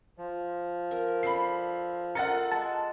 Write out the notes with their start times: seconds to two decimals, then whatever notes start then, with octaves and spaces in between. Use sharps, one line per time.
0.18 F3
0.91 A#4
1.23 D4 A4 B5 C7
2.15 F4 A4 A#4 D#5 F#5 A6 C#7
2.51 G#3 A5